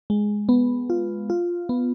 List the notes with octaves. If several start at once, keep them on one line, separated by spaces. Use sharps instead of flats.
G#3
B3
F4
F4
B3